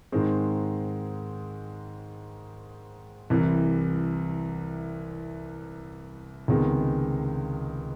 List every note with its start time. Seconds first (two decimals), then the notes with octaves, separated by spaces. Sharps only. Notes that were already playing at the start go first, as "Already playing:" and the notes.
0.12 G#2 D#3 G#3 C4
3.30 C2 C3 E3
6.48 C#2 C3 D#3 G#3 B3